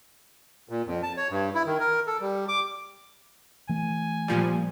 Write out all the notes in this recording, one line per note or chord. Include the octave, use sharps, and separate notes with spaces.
A#2
F2
A5
C#5
G2
E4
D#3
A#4
A4
G3
D6
E3 A3 G#5
A#2 F3 G3